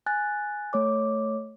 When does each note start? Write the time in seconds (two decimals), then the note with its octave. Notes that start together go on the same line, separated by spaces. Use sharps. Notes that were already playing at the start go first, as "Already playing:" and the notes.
0.06 G#5 F#6 A6
0.73 A3 C#5 D6